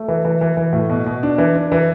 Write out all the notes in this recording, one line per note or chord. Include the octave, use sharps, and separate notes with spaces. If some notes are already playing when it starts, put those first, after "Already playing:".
Already playing: A3
E3
E3
E3
E3
A2
B2
B2
D4
E3
D4
E3